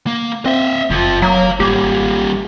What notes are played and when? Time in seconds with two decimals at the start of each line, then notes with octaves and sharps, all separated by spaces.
0.07 A#3
0.46 C4 D#5 E5
0.90 F#1 F2 F3
1.22 F#3 F5 A#5
1.60 G#1 G3 A#3 G4